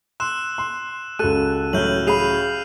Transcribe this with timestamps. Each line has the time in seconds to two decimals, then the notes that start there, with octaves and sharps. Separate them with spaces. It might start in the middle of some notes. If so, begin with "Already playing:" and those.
0.20 C6 E6 F#6 E7
0.58 C6
1.19 C#2 F#4 A4 F#6 D#7
1.73 A1 A2 F#3 F6 G6 F#7
2.07 G#4 F5 B5 C7 D#7 F7